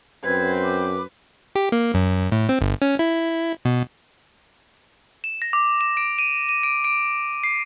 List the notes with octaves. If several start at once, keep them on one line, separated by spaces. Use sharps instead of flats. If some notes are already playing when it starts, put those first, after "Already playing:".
F#2 C4 B4 C5 G#6
D6
G4
A#3
F#2
A2
C4
G1
C#4
E4
B2
E7
A#6
D6
E7
D7
D#7
D#7
D7
D7
C7